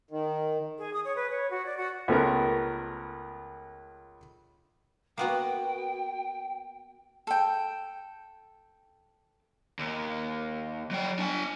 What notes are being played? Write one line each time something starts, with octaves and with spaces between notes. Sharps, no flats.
D#3
G#4
D#6
C#5
B4
C#5
F#4
D5
F#4
C#2 A3 B3 A#4
A#3 B3 F#4 G5
A4 G5
D#2
F#3 G5
D4 G#5